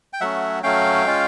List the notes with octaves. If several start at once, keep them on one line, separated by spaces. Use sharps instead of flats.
G5
F#3 A3 C#4 E5 F#5
F#3 A3 C#4 F5 G5
G#3 C#4 F4